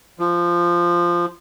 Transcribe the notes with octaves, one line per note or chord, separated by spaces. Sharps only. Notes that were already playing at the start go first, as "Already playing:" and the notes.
F3